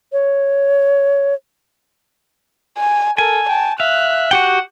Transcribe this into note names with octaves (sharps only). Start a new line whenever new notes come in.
C#5
G#5
A4 A#4 G#5
G5 A5
E5 F5 F#6
F#4 G4 F#5 G5